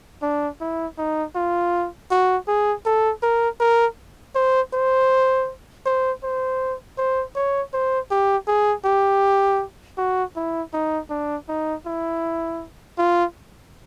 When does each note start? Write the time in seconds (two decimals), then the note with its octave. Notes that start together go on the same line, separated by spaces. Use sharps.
0.22 D4
0.61 E4
0.98 D#4
1.36 F4
2.11 F#4
2.48 G#4
2.86 A4
3.23 A#4
3.60 A#4
4.35 C5
4.73 C5
5.86 C5
6.23 C5
6.98 C5
7.35 C#5
7.73 C5
8.11 G4
8.47 G#4
8.85 G4
9.98 F#4
10.36 E4
10.73 D#4
11.10 D4
11.49 D#4
11.86 E4
12.98 F4